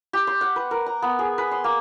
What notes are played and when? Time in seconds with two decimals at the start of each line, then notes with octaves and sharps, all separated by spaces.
0.13 G4
0.27 C6
0.41 F#5
0.56 B4
0.71 A#4
0.86 A#5
1.02 B3
1.19 G#4
1.38 B4
1.51 C6
1.64 A#3